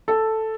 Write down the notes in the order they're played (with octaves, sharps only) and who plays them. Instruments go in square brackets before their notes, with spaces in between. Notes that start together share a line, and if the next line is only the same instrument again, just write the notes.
[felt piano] A4